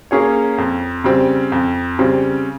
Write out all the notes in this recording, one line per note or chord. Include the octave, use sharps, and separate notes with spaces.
A#3 C#4 G#4 C#5
F2
C#3 G3 C4
F2
C#3 G3 C4